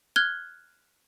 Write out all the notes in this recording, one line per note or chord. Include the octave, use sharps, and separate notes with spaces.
F6 F#6 G#6 G7